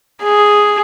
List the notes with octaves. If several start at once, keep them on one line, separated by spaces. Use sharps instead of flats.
G#4